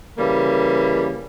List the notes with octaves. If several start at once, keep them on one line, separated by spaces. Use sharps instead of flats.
C#3 E3 G3 A#3